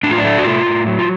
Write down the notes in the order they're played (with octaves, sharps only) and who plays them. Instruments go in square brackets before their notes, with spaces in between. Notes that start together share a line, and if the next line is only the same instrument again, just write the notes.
[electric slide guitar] A2 D4
F4
D4
A3
F#4
A2 F4
A2
F#3
F4